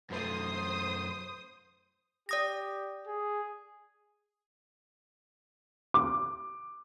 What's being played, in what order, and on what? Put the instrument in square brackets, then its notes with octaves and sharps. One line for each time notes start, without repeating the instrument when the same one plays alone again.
[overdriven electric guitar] F#2 A3 [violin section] C5 D#6
[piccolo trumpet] G4 [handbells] D5 D#6 A#6
[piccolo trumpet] G#4
[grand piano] D6